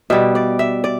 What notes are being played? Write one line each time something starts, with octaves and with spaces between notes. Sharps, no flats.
B2 G3 E5
D5
E5
D5